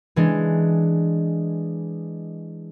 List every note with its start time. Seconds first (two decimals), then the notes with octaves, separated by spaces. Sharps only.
0.16 E3 G#3 D4